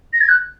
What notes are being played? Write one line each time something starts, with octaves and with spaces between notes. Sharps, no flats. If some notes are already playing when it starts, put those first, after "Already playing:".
A#6
G#6
F#6